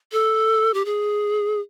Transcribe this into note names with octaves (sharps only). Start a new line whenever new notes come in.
A4
G4
G#4